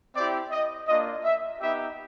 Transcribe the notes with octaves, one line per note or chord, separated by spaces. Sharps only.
C4 E4 G4 D5
D#5
A#3 D4 F4 D#5
E5
B3 D#4 G4 E5